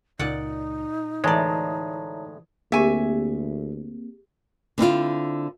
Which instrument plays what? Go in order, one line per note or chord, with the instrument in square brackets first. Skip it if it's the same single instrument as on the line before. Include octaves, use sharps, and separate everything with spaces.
[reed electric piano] C#2 [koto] A#2 D5 F#5 [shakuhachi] D#4
[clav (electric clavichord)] D2 A2 G#3 [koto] E3 D5 [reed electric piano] C#5 A5 A#5
[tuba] D2 [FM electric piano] A#3 C4 [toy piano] G4 G#4 [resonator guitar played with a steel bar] E5 G#5
[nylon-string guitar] D3 C4 E4 F4